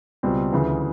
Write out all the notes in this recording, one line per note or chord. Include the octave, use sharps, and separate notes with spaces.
C#2 B2 G3 C4
D2 C#3 E3